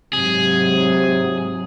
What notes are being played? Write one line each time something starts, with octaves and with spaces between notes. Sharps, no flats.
G#2 C3 F#3 G#4